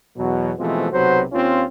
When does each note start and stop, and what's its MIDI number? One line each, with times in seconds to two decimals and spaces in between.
0.17 0.52 40
0.17 0.52 47
0.17 0.52 54
0.59 0.88 47
0.59 0.88 52
0.59 0.88 53
0.59 0.88 56
0.59 0.88 57
0.59 0.88 60
0.92 1.23 35
0.92 1.23 48
0.92 1.23 54
0.92 1.23 66
0.92 1.23 71
0.92 1.23 72
1.32 1.64 39
1.32 1.64 60
1.32 1.64 61
1.32 1.64 65